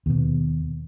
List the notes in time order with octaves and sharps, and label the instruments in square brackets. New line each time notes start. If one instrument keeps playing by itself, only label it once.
[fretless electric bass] D#2 B2